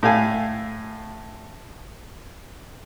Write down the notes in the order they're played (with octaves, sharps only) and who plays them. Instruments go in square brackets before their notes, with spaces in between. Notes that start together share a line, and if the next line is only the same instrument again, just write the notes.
[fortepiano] A2 A3 F5 G#5